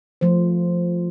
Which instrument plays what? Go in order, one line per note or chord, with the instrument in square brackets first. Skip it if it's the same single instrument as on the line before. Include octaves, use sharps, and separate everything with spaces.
[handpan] F3 A3 C5